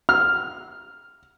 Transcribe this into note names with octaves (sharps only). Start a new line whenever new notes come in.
F6